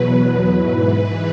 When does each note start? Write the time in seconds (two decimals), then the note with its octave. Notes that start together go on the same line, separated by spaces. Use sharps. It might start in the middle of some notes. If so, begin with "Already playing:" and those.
Already playing: E2 B2 F#3 B4
0.55 G#2 E3 B4
0.88 B4